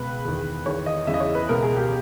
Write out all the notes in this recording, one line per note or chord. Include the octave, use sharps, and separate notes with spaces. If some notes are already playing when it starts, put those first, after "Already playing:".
Already playing: C#2 B2 B4
E2 D#3
E2 D#3 C#5
D#5
E2 C#3 E3 E5
D#5
C#5
B4
C#2 B2 A#4
G#4
G4